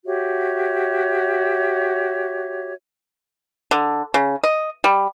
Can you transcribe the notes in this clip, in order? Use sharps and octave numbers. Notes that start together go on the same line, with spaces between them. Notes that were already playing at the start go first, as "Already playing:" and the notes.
F#4 G4 C#5 E5
D3
C#3
D#5
G3